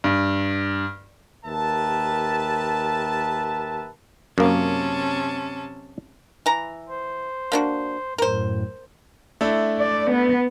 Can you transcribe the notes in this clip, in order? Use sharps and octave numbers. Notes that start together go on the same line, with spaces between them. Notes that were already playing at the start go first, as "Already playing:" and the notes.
G2
D#2 G4 A#4 B4 E5 A5
F#2 C3 A#3 C#4 A5
E3 A#5
C5
A#3 D4 F#4
F#2 A2 A#4 C5
A3 D4 E4
D5
B3